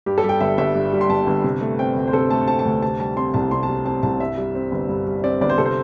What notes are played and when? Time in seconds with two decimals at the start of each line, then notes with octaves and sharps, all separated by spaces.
0.06 G2 G4
0.18 A4
0.24 G3
0.29 G5
0.40 G1 E5
0.58 G1 E5
0.75 G2
0.93 G3
1.01 C6
1.09 G1 A5
1.27 G1
1.44 C3
1.61 A3
1.79 C4 G5
1.97 D2
2.08 C5
2.13 C3 A4
2.30 A3 A5
2.47 C4 A5
2.59 A5
2.65 D2
2.82 C3 A5
2.99 G3 A5
3.17 C4 C6
3.34 C2 A5
3.51 C3 C6
3.63 A5
3.69 G3
3.86 C4 A5
4.03 C2 A5
4.20 G2 E5
4.38 G3
4.55 C4
4.72 G1
4.89 G2
5.07 G3
5.24 C4 D5
5.41 G1 D5
5.49 C5
5.58 C3 A4
5.66 C5